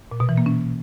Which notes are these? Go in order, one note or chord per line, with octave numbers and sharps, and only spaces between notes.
A#2
B2
E3
A#3
C#4